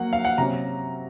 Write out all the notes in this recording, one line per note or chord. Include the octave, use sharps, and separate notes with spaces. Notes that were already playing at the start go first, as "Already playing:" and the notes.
Already playing: F#3 A#3 F#5
F5
F#5
C3 F#3 C#4 A#5